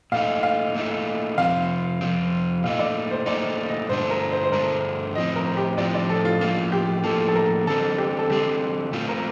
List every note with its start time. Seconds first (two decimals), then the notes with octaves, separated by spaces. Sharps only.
0.12 A#2 A3 D#4 F5
0.43 F5
0.75 A#2 A3 D#4
1.37 F2 C3 F3 C4 F5
2.01 F2 C3 F3 C4
2.63 A#2 A3 D#4 F5
2.79 D5
3.11 C5
3.26 A#2 A3 D#4 D5
3.69 D#5
3.89 G2 D3 A3 D4 C5
4.10 A#4
4.32 C5
4.43 C5
4.52 G2 D3 A3 D4 A#4
5.15 A2 F3 C4 D#5
5.36 A#4
5.57 G4
5.78 A2 F3 C4 D5
5.94 D5
6.10 A4
6.25 F4
6.41 A2 F3 A#3 F4
6.72 G4
7.04 A2 F3 A#3 A4
7.28 A4
7.35 A#4
7.67 D3 G3 C4 A4
7.98 G4
8.19 A4
8.30 D3 G3 C4 G4
8.92 A#2 A3 C4 F4
9.08 A#4